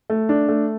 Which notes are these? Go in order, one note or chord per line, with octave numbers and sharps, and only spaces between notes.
A3
D4
A3